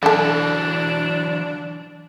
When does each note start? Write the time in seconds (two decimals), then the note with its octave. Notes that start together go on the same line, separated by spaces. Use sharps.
0.03 D3 E3 F#3 D4 A4